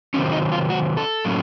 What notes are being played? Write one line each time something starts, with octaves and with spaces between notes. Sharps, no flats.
C3 D#3 F#3 C4 C#4
D#4
F4
F#4
A4
A2 F#3 A#3 C#4